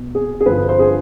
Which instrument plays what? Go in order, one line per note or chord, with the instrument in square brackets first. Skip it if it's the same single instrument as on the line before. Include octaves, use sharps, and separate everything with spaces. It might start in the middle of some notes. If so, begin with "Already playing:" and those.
Already playing: [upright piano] B2
G#4
G#4
G2 D3 F3 B4
C5
G#4